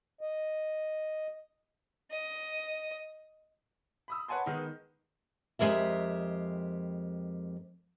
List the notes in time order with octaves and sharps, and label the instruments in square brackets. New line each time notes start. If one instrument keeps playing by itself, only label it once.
[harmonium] D#5
[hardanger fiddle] D#5
[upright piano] B5 D#6 E6
B4 C#5 F#5 G#5 A5 C6
D#3 G#3 B3 D#4
[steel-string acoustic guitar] F2 G#3 G4 A#4 E5